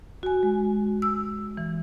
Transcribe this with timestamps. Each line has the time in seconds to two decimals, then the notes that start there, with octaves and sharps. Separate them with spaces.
0.23 F#4 G#5
0.43 G#3
1.02 E6
1.57 E3